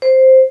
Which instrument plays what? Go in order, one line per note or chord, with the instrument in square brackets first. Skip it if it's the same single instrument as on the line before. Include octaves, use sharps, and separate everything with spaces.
[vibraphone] C5